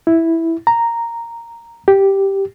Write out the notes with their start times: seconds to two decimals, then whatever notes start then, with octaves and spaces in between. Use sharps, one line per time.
0.07 E4
0.67 A#5
1.88 G4